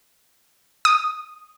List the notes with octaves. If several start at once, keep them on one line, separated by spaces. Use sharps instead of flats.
D#6